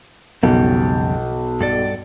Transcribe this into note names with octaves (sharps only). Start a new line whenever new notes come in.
B1 F2 C#3 G3
G2 A4 D5